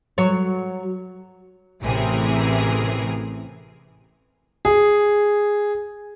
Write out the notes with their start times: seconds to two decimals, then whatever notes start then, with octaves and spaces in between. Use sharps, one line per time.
0.18 F#3 C#5
1.82 A1 C3 E3 A3 G#4 A#4
4.65 G#4